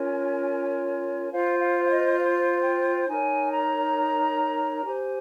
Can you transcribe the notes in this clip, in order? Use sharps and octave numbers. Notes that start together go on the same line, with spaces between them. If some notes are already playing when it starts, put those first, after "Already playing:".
Already playing: C#4 F4 A#4 C#5 G#5
F4 C5 F5
F5
F5
D#5
F5
G5
D#4 A#4 C#5 G#5
A#5
G4 C5 G#5